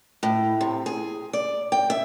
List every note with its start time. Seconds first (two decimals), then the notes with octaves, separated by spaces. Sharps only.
0.23 A2
0.61 C3
0.86 G#4
1.33 D5
1.72 G5
1.90 E5